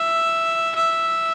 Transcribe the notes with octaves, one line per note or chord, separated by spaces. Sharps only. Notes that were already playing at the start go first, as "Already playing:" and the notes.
Already playing: E5
E5